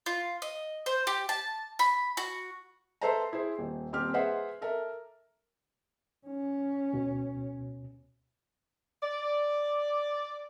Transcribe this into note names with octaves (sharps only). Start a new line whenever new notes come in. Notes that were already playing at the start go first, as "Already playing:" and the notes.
F4
D#5
C5
G4
A5
B5
F#4
A4 B4 C5 E5 A5 A#5
E4 G#4 C5
D#1
D#1 C4 G4 F6
G#4 B4 C5 D#5 E5 F#5
A4 A#4 E5
C#4
D2 B2
D5